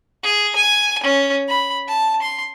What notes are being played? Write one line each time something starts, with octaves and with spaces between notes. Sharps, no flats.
G#4
G#5
C#4
B5
A5
C6